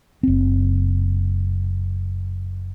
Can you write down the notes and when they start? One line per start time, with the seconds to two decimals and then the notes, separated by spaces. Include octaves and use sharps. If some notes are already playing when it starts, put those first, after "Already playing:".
0.23 F#1 C4